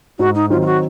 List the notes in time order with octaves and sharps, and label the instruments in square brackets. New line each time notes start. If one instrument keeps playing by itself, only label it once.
[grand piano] G#2 [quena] F#4
[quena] D#4
[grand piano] D#3 F#3 C4 D#4 [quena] F4
[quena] F4
F#4